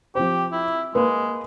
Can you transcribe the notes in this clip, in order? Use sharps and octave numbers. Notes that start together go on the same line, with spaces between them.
F3 C4 G4 C5
E4
G#3 A#3 B4